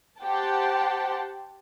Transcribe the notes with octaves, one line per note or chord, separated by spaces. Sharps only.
G4 C5 F#5 G5 A5